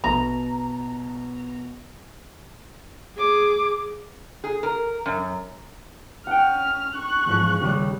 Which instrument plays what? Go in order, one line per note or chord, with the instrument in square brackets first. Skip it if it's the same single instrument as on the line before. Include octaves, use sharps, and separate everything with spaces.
[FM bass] A#1 [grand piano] B2 [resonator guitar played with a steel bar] A#5
[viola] G#4 D6
[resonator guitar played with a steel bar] G#4
A#4
F#2
[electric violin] C#4 F6 [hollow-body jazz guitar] F#5 G5
[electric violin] C#6 F#6
[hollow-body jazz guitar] E2 G#2 F3
D#2 C#3 G3